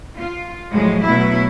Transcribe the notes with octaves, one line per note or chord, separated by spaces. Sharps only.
F4
A2 F3 F#3 G#3
B2 F#3 A3 E4